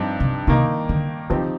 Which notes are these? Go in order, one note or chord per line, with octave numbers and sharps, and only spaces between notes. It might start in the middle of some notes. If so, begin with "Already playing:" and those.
Already playing: G2 F3 C4 D#4
C3
C3 D#3 A#3 D#4
D3
D#3 F3 C4 D#4 G4